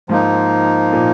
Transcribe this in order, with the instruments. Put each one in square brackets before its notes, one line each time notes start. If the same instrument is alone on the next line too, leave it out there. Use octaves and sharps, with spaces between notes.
[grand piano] G#2 [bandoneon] F3 A#3 D#4
[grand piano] A#2